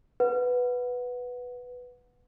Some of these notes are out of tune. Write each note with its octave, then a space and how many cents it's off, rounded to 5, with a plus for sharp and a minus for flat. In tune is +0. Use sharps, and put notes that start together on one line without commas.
B4 +0 F#5 -15